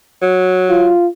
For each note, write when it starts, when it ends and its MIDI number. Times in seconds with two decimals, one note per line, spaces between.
0.22 0.91 54
0.70 1.08 65